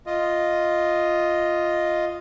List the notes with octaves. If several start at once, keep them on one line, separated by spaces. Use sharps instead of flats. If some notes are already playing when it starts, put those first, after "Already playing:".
F4 D#5